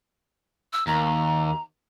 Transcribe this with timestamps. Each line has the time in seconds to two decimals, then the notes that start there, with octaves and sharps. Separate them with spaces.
0.73 E6
0.87 D#2 A#5